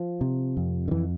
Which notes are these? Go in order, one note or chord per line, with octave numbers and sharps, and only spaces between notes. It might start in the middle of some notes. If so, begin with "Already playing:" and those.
Already playing: F3
C3
F2
D3
F2 E3